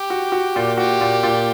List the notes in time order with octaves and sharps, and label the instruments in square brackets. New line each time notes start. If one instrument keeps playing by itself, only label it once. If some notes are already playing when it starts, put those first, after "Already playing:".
Already playing: [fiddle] G4
[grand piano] F#4
F#4
A#2
[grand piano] F#4 [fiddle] G4
[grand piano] A#2
A#2